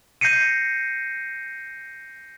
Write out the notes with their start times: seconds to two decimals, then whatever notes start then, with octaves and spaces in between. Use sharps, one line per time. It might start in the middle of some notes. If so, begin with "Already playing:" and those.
0.21 G6 A#6 C7 C#7 D#7